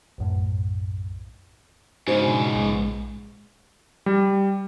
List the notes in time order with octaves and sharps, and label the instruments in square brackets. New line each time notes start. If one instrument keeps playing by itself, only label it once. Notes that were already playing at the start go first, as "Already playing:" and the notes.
[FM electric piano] B1 F#2 A2
[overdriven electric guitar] G#2 C#3 [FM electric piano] D4 F#4 C5
[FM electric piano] B2
A#1 G#3
[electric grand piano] G3